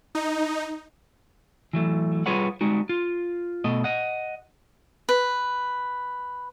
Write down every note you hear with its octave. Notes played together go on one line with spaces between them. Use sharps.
D#4
E3 F#3 A3
G3 F4 G#4 B4 C#5 F#5
G3 G#3 D#4 F#4
F4
B2 A3 D#5
D#5 F#5
B4